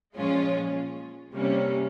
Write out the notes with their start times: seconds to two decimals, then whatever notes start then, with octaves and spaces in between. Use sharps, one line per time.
0.16 A#2 F3 G#3 C#4 F4
1.32 C3 G3 A#3 C#4